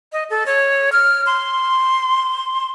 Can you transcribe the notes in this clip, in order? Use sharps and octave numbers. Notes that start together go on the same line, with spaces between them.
D#5
A4
C#5
F6
C6